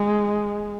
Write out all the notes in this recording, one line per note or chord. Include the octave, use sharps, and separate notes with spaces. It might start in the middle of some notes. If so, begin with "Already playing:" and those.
Already playing: G#3